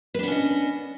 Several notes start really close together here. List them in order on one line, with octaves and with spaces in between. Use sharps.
B4 D4 B3 C#4 D#5